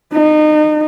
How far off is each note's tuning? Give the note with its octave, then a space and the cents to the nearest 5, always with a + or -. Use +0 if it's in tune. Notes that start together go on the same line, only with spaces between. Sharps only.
D#4 -30